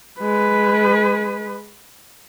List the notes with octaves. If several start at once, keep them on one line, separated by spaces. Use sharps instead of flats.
G#3 B4